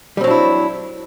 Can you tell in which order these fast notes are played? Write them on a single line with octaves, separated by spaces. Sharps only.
G3 C4 F#3 D4 E4